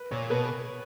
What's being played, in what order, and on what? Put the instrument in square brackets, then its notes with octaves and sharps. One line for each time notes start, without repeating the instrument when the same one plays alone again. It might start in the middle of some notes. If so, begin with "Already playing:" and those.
Already playing: [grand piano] B4
[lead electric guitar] A#2 [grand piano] C#5
[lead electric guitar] B2 [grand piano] B4